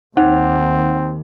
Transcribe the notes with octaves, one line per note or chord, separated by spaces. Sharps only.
D#2 C4 D#4 F#5